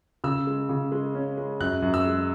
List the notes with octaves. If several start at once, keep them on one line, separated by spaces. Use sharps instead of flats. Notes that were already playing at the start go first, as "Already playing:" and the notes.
C#3 E6
G#3
C#3
G#3
C#4
G#3
F#2 F#6
F#2
E6
G#3